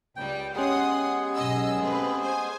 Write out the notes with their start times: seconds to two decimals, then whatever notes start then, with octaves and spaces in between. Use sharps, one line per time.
0.16 C#2 G3 G5
0.56 G#3 B3 C#4 G4 G#4 F#5 C6 D#6
1.35 B1 D#5 E6
1.79 A3 C4 B4
2.22 C5 G#5